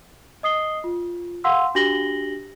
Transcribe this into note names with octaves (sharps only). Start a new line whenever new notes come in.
D#5 D#6 C7 G7
F4
F5 F#5 C6 E6
D4 F#4 G4 A#6 F#7 G7